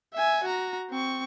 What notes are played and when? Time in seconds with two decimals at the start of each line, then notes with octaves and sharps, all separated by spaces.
0.13 E5 G#5
0.44 F#4 A#5
0.90 C4 C#6